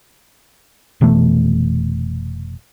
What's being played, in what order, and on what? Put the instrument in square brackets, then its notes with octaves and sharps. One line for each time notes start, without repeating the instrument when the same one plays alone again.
[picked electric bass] F1 B2 E3 A3